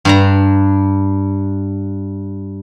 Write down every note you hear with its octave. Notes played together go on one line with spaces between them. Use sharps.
G2 D4 A#5